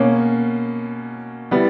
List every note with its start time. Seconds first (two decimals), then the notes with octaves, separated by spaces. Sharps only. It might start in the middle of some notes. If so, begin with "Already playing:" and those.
Already playing: B2 A#3 C#4
1.51 G3 B3 E4